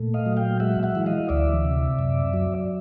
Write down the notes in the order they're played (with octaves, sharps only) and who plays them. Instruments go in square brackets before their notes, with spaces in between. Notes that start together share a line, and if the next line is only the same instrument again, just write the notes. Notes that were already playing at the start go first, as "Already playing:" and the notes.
Already playing: [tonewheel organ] A#2 A3
D#5 F5
F#3
F5 G5
G#3 E5 F#5
E5 F#5
E3
D#5 F5
D2 D5 E5
C3
F#2
F#3